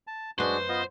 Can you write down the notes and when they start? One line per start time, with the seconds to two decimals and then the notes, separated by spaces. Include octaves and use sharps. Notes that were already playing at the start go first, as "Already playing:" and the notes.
0.07 A5
0.39 F#2 G#3 D4 F#4 B4 C5
0.69 B3 F4 D#5